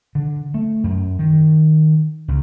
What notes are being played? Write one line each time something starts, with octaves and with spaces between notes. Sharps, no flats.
D3
A3
F#2
D#3
C#2